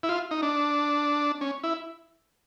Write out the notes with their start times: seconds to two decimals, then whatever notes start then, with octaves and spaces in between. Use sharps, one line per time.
0.03 E4
0.09 F4
0.31 D#4
0.42 D4
1.41 C#4
1.63 E4